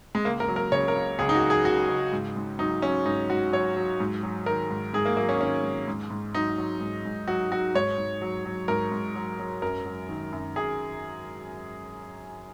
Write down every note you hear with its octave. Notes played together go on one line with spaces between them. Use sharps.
G#3
C#2 A#3
A#4
F#3
A#4
C#3 C#5
A#4
C#2
C#2 G#4
D#4
F#4
F#3
G#4
C#3 F#4
C#2
G#2
G#2
F#3 D#4
F#3 C#4
G#2 D#4
G#2 F#4
F#3 C#5
F#3
G#2
F#3
D#3 A#4
G#2
G#2 G#4
A#3
F#3 A#3
C#4
D#3 C#4
G#2
G#2
G#2
F#3 D#4
F#3
G#2
G#2
F#3 F#4
F#3 F#4
G#2 C#5
G#2
F#3
F#3
G#2 A#4
G#2
F#3
F#3
F#2 A#4
F#3
D#3
F#2
F#2 G#4